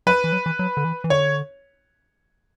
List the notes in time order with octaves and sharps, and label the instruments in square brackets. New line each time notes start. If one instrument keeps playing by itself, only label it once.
[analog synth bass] F#3 [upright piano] B4
[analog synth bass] E3
F#3
E3
F#3
D3
E3
E3
[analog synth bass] D3 [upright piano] C#5